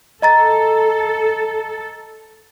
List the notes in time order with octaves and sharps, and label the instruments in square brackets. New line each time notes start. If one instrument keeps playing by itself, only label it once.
[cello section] A4 [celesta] D#5 A#5 A6